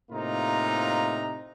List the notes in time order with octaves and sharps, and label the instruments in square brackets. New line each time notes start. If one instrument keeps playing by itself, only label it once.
[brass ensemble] A2 C3 A#3 D#4 F4 A#5